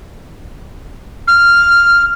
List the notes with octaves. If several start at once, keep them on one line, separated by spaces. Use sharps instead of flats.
F6